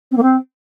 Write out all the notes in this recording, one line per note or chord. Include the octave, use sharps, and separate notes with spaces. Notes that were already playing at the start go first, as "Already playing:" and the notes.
C4
A#3
C4